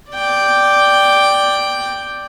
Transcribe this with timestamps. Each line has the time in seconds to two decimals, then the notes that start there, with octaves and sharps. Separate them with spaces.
0.11 D5 G5